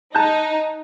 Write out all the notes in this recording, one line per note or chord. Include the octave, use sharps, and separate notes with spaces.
D#4 A5 F#6 G6